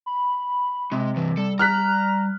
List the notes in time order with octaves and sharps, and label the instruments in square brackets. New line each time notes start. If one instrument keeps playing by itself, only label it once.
[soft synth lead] B5
[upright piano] C3 [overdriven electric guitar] G#3
[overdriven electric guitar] C2 G2 [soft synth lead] E3
[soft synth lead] G3 [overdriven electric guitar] A4
[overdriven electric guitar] A#5 [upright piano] F6 F#6 B6